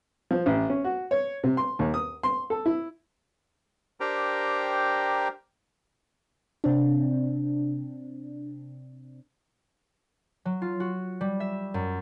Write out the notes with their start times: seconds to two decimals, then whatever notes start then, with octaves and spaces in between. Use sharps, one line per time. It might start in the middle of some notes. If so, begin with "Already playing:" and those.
0.31 F3
0.46 A1
0.70 C#4
0.84 F#4
1.11 C#5
1.44 C3
1.57 C6
1.79 D#2
1.94 D#6
2.23 C6
2.50 A4
2.66 E4
4.00 D4 G4 A#4 C5 G5 A#5
6.64 C3 C4 D4
10.45 F#3
10.62 F4
10.80 F#4
11.21 G3
11.40 E5
11.74 F#2